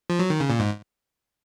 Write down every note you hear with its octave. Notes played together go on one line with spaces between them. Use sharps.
F3
F#3
D#3
C#3
A#2
G#2